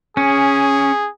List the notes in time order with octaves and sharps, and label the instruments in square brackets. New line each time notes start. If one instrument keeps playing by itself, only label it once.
[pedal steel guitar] C#4 [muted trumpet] G#4